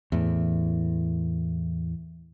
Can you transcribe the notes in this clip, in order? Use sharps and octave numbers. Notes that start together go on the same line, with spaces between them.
E2 A2